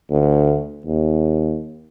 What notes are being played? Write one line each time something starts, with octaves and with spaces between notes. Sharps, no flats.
D2
D#2